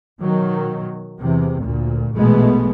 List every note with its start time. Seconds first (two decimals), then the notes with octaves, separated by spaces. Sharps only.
0.20 B2 D#3 F#3
1.18 E2 C3
1.61 D2 A#2
2.13 A#1 B2 E3 G#3 A3 B3